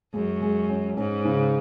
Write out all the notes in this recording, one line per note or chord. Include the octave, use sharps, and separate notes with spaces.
F#2 G#3
G#3
C#4
G#2 C#4
C#3